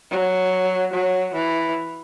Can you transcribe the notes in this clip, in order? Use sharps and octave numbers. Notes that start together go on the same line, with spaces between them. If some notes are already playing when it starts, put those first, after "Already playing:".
F#3
F#3
E3